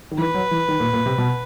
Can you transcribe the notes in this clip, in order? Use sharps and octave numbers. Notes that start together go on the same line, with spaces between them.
D#3
E3 B4
F#3
E3
D#3
A#2
A#2
C3
B2